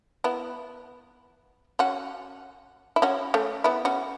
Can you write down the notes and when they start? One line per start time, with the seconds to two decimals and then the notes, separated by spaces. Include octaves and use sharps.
0.24 B3 E4
1.79 C#4 F#4
2.96 E4
3.02 C#4 F#4
3.34 A3 C#4
3.64 B3 E4
3.85 C#4 F#4